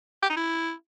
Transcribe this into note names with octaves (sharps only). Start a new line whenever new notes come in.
G4
D#4
E4